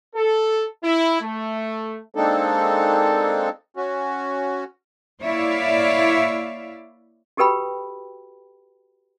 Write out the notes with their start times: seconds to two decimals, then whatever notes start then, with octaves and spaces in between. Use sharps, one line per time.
0.15 A4
0.83 E4
1.21 A3
2.15 G#3 A#3 C4 D4 D#4 A4
3.77 C#4 F#4
5.22 A#3 E4 C#5 D5 E5 F5
7.37 F#4 G4 A4 B4 G5 B5